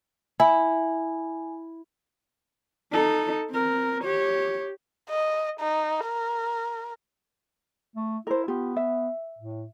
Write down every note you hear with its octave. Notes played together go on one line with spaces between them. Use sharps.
E4 G#5
D#4 A4
C4 A#4
G4 C#5
D#5
D#4
A#4
A3
E4 A#4 C5
B3 F4 G4
E5
A2